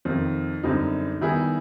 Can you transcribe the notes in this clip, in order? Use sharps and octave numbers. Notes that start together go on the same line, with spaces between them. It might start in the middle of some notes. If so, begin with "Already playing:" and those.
F2 C3 D#3
F#2 D3 G3 C4 D#4
D#3 G3 B3 E4 G#4